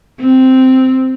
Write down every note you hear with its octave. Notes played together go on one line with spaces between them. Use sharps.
C4